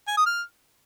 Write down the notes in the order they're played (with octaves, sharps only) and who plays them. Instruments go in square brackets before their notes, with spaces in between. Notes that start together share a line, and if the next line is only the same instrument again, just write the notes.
[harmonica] G#5
D#6
F6